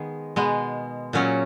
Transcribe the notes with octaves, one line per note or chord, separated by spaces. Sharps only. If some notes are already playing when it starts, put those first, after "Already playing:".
Already playing: D#3 G#3 B3 G#4
B2 G#3 B3
A#2 F#3 C#4